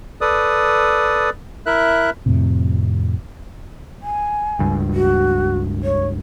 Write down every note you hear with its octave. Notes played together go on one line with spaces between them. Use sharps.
A4 B4 D5 D#6
E4 A#4 E5 F#6
F2 A2 C3
G#5
C#2 G2
F#4
C#5